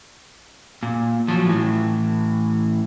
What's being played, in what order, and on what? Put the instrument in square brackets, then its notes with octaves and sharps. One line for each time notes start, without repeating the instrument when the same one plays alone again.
[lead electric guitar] A#2
F3 F#3
A2 E3